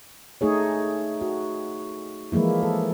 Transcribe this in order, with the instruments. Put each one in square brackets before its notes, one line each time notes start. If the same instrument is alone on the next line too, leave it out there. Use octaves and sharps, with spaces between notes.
[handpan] A3 D#4 G#4 C#5
F#4
E3 F3 G#3 A#3 E4
A4